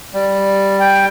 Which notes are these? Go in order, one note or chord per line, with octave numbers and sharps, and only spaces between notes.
G3
G5